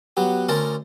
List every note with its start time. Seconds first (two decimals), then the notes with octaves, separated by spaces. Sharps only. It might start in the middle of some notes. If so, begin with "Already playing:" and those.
0.17 F#3 B3 G4
0.49 D2 C#4 A#4 C5 D5 A5